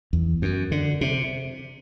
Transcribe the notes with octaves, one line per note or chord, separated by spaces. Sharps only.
E2
F#2
D3
C3